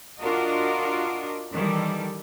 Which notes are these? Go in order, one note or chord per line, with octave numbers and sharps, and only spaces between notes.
D4 F4 F#4 A#4 D#5
D#3 E3 G3 A4